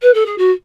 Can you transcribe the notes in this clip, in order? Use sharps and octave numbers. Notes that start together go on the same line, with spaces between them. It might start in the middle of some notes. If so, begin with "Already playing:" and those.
B4
A4
G#4
F#4